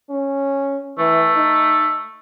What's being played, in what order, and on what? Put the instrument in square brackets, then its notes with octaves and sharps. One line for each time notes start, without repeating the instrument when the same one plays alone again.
[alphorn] C#4
[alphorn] E3 [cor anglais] A3
[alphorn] D#4